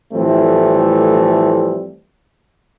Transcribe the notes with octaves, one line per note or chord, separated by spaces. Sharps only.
A2 E3 F3 G3 A3 C4